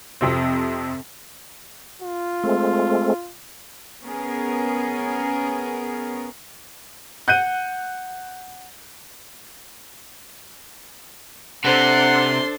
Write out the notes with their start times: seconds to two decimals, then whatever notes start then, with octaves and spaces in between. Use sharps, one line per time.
0.21 F2 C3 C4
2.02 F4
2.43 G#3 A3 C4
4.02 B3 C#4 G#4 A#4
7.28 F#5 F#6 G6 D#7
11.64 C3 D4 A4 C5 F#5 C6